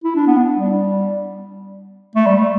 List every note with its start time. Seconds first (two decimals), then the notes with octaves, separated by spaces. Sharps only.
0.04 E4
0.16 D4
0.27 B3
0.37 D4
0.58 G3
2.15 A3
2.27 G3
2.39 A3